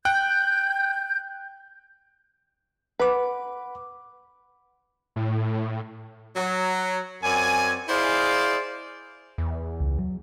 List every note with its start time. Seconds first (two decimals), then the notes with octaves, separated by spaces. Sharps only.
0.05 G5 F#6 G6
3.00 B4 F#5 B5 D6
5.16 A2
6.37 F#3
7.24 F#2 C4 D5 G#5
7.89 E4 G#4 C5 D5 D#5 F5
9.38 E2
9.80 C#2
9.99 F#3